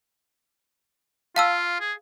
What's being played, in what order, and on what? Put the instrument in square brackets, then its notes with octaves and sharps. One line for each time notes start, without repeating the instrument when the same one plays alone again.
[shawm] F4 [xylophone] F5 A5 E6
[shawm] G#4